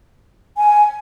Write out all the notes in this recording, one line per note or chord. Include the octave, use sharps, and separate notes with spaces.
G#5